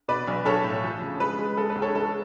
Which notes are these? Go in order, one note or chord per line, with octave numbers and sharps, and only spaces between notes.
B2 B4 D5
B1
B1 A4 C#5
A2
F3
C#3
G#3 B4
G#3
G#3 A4
B4
C#2
A4 C#5
G#3 A4